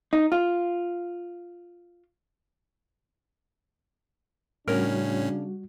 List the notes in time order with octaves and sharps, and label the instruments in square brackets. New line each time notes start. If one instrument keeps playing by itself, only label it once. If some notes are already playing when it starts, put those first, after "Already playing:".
[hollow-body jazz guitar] D#4
F4
[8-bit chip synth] A2 C#4 [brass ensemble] C#3 D4 [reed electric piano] G3 F#4 [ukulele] A#4